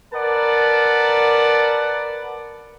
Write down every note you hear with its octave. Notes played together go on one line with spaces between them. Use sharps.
A#4 B4 D5 F#5 A5